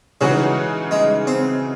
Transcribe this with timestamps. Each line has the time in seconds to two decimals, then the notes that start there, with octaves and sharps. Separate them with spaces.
0.21 C#3 E3 F#3 G#3 D#4 F#4
0.91 G#3
1.27 C4